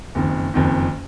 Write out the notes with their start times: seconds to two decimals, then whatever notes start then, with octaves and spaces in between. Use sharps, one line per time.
0.15 F#1 F2 D#3
0.54 F#1 F2 D#3